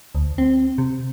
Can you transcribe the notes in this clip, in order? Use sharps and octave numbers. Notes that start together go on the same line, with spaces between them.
D2
C4
C3